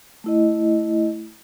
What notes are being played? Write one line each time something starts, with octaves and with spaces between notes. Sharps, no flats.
A3 E4 D#5